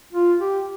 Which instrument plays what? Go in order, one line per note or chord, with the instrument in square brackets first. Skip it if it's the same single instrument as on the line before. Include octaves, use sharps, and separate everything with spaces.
[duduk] F4
G4